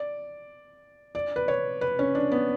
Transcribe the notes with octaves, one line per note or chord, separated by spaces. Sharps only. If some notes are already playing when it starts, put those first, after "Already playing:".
Already playing: D5
D5
B4
C#5
B4
C#4
D4
B3